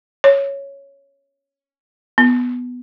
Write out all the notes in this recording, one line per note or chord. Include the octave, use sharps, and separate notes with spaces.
C#5
B3